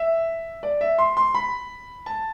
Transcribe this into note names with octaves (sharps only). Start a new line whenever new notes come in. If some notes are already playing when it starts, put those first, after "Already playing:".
Already playing: E5
D5
E5
C6
C6
B5
A5